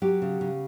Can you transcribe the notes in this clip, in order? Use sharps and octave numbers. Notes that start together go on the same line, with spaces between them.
F#3 G4
C#3
C#3